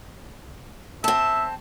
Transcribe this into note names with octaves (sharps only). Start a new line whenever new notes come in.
C4 E5 A5